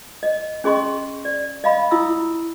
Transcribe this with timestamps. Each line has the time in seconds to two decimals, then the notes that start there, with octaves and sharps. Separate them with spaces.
0.23 D#5
0.64 C#4 G#4 D#5 C6 C#6
1.25 D5
1.64 D#5 F5 B5
1.91 E4 D#6 E6